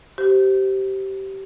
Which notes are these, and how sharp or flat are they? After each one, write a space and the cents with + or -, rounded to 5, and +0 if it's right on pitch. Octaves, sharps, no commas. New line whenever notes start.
G4 -25 C5 -5